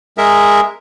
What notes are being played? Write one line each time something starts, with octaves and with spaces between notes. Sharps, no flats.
G#3 G#4 A#4 E5